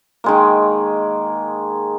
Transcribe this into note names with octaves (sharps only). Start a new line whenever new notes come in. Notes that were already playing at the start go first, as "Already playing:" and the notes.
D#3 G#3 A#3